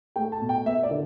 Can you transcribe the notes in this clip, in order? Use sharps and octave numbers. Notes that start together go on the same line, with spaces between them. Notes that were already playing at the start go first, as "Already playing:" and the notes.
A3 G5
A5
B2
G5
B3 E5
D5
D3